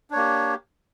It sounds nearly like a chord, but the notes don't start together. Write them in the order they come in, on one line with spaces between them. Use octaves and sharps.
D4 C#5 A#3 G4